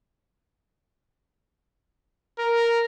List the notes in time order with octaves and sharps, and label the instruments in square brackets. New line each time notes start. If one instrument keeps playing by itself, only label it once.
[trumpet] A#4